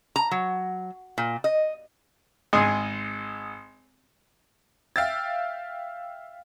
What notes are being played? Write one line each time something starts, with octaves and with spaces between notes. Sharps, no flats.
A#5
F#3
A#2
D#5
G#1 G#3 G#4 D#5 G#5 C6
E5 F5 G5 E6 A6